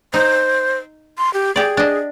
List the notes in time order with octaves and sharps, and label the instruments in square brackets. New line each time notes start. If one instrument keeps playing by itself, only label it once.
[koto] D#4 [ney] C5
[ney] C6
G4
[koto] G4 D5 [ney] G#4
[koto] D4 D#5